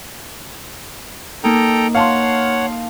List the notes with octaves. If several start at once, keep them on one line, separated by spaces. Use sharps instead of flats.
A#3 D#4 A4 G5 A#5
C#5 F5 F#5 A5 C6